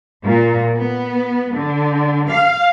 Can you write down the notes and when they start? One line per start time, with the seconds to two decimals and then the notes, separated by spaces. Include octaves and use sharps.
0.25 A#2
0.77 B3
1.54 D3
2.28 F5